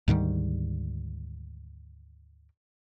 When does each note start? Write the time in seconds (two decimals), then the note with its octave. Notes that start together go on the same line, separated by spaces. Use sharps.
0.08 D2 G#2 D#3 G3